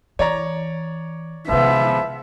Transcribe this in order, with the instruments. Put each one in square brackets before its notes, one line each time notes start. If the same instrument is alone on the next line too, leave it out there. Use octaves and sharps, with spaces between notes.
[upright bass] E3 [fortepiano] C#5 D5 A#5
[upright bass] C3 D#3 [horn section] F3 G#3 B3 [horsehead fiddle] E5